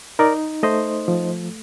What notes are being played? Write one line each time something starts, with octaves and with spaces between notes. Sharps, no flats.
D#4 A#4 D5
A3 C5 D#5
F3